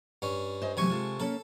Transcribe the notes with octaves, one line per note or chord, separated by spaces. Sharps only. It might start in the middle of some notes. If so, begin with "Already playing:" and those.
G2 C#4
C5 D#5 G#5
C3 E3 F#3 A3 G#5 C#6
G#3 F4 A4
A#3 C#4 A4 C#5